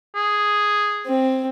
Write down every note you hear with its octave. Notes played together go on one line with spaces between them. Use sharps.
G#4
C4